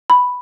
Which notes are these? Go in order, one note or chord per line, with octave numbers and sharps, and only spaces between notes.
B5